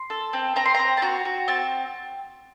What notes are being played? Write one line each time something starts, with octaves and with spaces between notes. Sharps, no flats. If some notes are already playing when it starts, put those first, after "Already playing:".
Already playing: C6
A4
C4
C4 A#5
C6
C4 A#5
A5
F#4 A#5
F#4
C4 A5